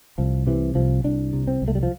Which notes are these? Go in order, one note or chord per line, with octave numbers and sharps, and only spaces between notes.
C2 F3
C3 E3
C2 F3
C2 D4
C3
C4
C2
A3
G3
F3